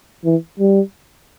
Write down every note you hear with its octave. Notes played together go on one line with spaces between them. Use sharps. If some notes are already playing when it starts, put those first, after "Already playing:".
E3
G3